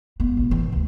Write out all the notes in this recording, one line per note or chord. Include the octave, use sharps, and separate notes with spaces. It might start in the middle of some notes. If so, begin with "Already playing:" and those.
B3
A1
E3
D2